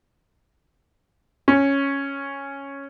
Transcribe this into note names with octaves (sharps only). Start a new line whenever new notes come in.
C#4